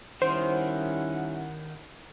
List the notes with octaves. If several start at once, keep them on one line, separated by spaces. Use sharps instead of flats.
D#3 G3 C#4 E4 C5 F#5